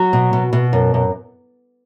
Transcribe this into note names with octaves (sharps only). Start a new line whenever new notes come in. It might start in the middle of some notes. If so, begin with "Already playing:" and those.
Already playing: F#3 F#4
B2
B2
B2
F#2
F#2